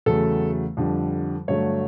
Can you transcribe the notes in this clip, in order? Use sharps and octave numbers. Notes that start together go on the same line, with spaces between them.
E2 C#3 F#3 A3 A4
F2 D3 G3
G2 D3 F#3 A3 C#5